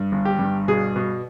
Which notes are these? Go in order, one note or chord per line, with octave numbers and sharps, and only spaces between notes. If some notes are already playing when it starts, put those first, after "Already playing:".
Already playing: G2
G1
G4
G2
B2 G#4
B2